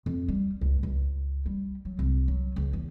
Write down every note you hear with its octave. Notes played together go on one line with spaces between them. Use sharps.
F2
G3
C#2
C#2
G3
F#3
C2
F#3
C#2
E2